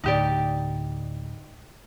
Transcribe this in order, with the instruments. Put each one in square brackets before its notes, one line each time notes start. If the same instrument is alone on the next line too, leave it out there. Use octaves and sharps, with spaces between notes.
[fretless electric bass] D2 A2 D3 [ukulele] D#4 G4 D5